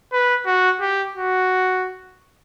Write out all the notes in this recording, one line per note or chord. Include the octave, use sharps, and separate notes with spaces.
B4
F#4
G4
F#4